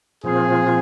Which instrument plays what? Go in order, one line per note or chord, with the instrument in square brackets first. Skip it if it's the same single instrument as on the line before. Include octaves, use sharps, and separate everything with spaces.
[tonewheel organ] A#2 F3 C4 F4 [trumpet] G#4